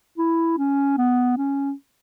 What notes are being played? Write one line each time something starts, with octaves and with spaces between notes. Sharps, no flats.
E4
C#4
B3
C#4